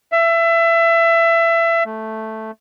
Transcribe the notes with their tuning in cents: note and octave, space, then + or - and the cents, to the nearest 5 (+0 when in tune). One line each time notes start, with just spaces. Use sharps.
E5 +25
A3 +0